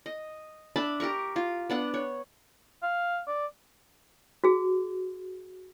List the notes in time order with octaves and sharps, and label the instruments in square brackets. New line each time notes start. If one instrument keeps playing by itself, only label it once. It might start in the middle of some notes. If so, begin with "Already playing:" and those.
[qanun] D#5
D4 E5 A5 B5
G4 A#4 A#5 C#6
F4
B3 D4 F#5
C#5
[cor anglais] F5
D5
[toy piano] F#4 G#4